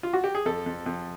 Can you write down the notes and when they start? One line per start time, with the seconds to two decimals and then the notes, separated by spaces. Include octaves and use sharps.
0.03 F4
0.13 F#4
0.24 G4
0.35 G#4
0.45 F2 A4
0.66 F2
0.86 F2